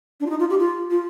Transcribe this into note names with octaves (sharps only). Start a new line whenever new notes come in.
D4
F4
D#4
F4
G4
F4
F4